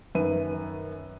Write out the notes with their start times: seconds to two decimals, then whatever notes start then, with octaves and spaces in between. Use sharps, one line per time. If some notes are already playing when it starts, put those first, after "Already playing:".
0.15 F#2 D#3 B4 E5 D#7